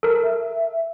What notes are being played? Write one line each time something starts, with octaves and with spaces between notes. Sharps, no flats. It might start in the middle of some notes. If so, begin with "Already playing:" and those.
A4 A#4
E5